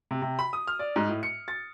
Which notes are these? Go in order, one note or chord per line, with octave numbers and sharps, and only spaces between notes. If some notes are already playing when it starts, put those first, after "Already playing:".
C3
C3
B5
D#6
F6
D5
G#2
A2
C#7
A6